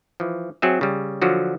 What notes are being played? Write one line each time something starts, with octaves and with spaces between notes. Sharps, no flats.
E3 F3
F#3 C4 G#4 E5
C#3 G3
D3 F3 F#3 F#4